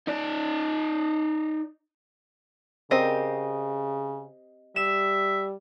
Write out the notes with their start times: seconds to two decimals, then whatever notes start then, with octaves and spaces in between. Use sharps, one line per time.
0.07 D#4 D5
2.91 C#3 C4 G4 A#4 D#5
4.76 G3 E5 E7